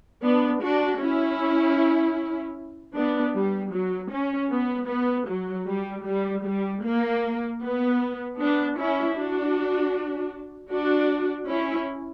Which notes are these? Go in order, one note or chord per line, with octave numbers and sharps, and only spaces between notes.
B3 D4
D4 F#4
C#4 E4
B3 D4
G3
F#3
C#4
B3
B3
F#3
G3
G3
G3
A#3
B3
B3 D4
C#4 E4
D4 F#4
D4 F#4
C#4 E4